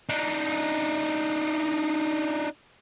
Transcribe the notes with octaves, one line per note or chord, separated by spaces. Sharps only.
D4 D#4